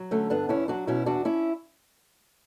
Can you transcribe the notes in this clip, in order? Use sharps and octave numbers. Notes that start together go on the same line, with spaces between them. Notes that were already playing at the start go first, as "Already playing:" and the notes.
Already playing: F#3
D3 A3 C#4
G2 B3 D4
E2 C#4 E4
F#3 D4 F#4
B2 C#4 E4
E2 D4 F#4
C#4 E4